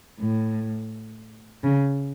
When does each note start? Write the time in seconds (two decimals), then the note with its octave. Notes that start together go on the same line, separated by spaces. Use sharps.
0.20 A2
1.64 C#3